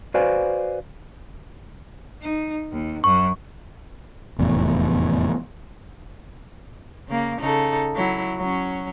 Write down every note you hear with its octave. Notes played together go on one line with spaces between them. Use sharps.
F#4 B4 C5 D5 F5 G#5
D#4
D#2
F#2 C#6
F1 E2 A2
C#3 A#3
C#3 D#4 A4
F#3 E4
F#3 C#4